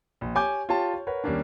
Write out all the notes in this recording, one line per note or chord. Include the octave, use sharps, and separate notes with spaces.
A#1
G4 C#5 G#5 D6 G6
F4 G4 C#5 G5 A5
C#5
A#4 B4 C#5 F#5
D#2 G3 A#3 C#4 D4